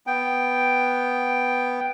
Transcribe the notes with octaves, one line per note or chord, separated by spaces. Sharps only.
B3 G5